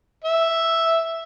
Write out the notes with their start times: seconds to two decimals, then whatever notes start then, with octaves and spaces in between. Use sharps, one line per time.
0.25 E5